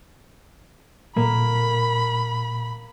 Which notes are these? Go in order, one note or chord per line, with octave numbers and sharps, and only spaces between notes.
A#2 A#3 B5